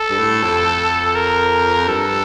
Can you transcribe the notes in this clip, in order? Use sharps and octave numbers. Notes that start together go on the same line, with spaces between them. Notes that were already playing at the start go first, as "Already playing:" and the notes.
Already playing: A4
G2
A2
F2
A#4
G2 A4